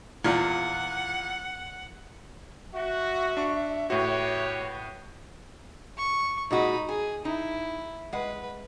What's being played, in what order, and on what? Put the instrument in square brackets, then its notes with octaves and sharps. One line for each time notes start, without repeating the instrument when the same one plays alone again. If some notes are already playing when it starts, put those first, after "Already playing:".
[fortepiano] E2 A#2 F4 [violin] F#5
[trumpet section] F#4 [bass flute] E5
[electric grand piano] D4 C#6
[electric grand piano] A2 F#4 [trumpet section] G4 B4 C#5
[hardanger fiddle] C#6
[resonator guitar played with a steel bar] A#2 G#3 F#4 [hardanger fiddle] D#4 B5
[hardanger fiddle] G#4 [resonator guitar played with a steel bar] G#5
[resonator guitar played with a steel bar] D#4 [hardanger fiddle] E4
[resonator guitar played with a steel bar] G#3 F#5 [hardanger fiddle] B4